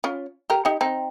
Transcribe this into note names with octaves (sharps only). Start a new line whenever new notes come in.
C#4 F4
G4 A#4
D#4 G4
C4 D#4